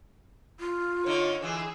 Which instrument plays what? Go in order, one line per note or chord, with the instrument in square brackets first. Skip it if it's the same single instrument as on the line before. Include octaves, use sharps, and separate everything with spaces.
[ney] F4
[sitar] D3 D#4 [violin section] C#5
[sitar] D3 E3 F4 [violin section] G#4 E6